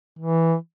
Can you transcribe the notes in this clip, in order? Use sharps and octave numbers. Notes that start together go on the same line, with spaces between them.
E3